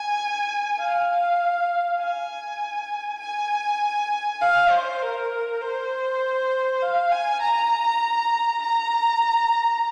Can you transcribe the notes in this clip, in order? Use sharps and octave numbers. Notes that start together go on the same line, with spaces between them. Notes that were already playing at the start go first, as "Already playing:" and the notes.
Already playing: G#5
F5
G#5
G#5
F5
C5
A#4
C5
F5
G#5
A#5
A#5